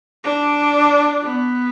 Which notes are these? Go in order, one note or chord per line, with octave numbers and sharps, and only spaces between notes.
D4
B3